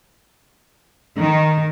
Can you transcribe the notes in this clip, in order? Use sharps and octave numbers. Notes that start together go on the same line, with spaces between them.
D#3